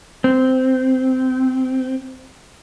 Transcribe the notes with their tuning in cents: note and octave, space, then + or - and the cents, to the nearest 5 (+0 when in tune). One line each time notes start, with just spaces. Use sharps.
C4 -15